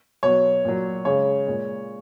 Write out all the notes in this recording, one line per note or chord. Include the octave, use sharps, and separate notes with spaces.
B2 F#3 C#5
A#2 F#3
C#3 G#3 C#5
A#2 G#3